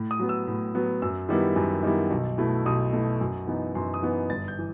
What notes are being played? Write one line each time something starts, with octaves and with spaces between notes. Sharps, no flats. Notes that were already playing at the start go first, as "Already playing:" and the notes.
Already playing: A2
D#6
F#3 B3
E6
A2
F#3 B3
F#2 E6
D#3 G3 B3 E4
F#2
D#3 G3 B3 E4
B1
B2 A3 E4
B1 D#6
B2 A3 E4
F#2
E3 B3 D#4
F#2 C6
D#6
E3 B3 D#4
G1 A6
G6
E3